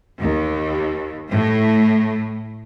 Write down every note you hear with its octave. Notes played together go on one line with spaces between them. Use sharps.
D#2
A2